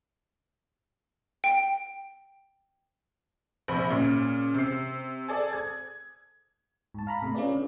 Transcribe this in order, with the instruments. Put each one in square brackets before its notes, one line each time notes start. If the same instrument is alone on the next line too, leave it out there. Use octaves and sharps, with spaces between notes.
[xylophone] G5
[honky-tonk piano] A#1 C3 B5
A#2 C#3
C3 C7
G#4 A4 D5
G#6
[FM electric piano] G#2 A5
F5 A#5 B5
C3 A3
C#4 F4 G#4 B4 D5
D3